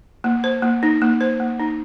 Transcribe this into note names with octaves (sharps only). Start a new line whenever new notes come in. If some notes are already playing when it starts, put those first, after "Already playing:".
A#3
C5
A#3
D#4
A#3
C5
A#3
D#4